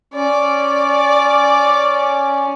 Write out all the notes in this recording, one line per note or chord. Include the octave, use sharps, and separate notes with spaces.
C#4 D5